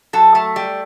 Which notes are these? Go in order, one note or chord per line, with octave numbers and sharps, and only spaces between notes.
F#3 A4
A3
G3